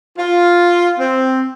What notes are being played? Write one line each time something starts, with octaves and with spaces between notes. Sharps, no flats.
F4
C4